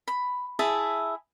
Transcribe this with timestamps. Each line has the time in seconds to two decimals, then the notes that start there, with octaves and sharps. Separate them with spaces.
0.08 B5
0.59 E4 G#4 E5 A5